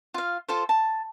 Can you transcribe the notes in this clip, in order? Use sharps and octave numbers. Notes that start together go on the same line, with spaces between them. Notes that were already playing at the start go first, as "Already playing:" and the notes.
F4 F5
F4 A4 C5
A5